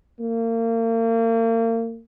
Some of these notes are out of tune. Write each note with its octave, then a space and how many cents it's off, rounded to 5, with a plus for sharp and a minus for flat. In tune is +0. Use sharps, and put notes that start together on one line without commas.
A#3 -35